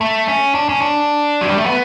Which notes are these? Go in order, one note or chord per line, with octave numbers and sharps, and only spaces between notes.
A3
C#4
D4
C#4
D4
F#3
G3
A3
B3